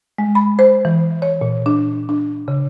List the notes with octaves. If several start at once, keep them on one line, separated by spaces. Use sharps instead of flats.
G#3
B5
C5
E3
C#5
A#2
D4
D4
C#3